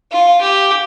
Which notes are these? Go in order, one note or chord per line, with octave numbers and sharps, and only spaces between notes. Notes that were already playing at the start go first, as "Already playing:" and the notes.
F4
G4